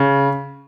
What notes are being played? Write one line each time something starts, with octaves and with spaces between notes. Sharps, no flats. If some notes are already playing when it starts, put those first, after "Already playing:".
Already playing: C#3